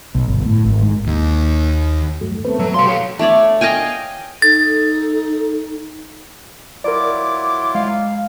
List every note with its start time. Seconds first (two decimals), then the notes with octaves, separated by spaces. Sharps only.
0.15 B1
0.28 G1
0.46 A2
0.64 G#1
0.82 G#2
1.07 D#2
2.21 G2 F#3 A3
2.45 A3 B3 C4 B4
2.59 F#3 B4 E5
2.74 B2 F#4 A4 F5 C6
2.86 G4 C#5
3.19 A3 D4 C#5 D5
3.61 D#5 F5 G5 G#5
4.42 D#4 A4 A6
6.84 F#3 E4 F4 A#4 D5 D6
7.75 G#3 F5